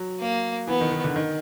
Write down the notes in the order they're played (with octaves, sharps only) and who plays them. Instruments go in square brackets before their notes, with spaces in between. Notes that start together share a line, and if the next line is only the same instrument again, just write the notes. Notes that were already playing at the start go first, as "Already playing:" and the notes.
Already playing: [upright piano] F#3
[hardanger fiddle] A#3
[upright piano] E3 [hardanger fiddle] B3
[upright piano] D#3
D#3
D3
D#3